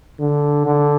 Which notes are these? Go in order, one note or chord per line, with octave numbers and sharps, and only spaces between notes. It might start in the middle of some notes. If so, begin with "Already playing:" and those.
D3
D3